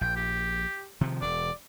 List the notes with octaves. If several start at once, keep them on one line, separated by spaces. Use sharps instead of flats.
A#1 G5
G4
C3 D#3 F3
E1 D5